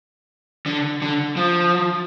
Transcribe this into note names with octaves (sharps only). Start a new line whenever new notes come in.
D3
D3
F3